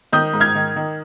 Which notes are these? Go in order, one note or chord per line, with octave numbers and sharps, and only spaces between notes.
D#3 D#6 G6
G#2
F6 G#6
D#3
D#3